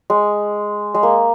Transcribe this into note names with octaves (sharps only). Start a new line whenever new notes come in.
G#3
G#3
A#3